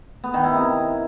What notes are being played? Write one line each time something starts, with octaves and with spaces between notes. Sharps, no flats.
B3
D#3
E4
C3